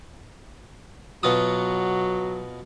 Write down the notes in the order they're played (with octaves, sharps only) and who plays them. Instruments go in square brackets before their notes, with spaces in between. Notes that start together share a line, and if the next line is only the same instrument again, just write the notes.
[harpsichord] B2 F4 D#6 [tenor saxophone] F#3